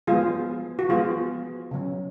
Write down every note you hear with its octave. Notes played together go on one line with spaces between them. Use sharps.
F3 G#3 B3 F4 G#4
F#4
F3 G#3 B3 F4 G#4
C#3 F#3 C#4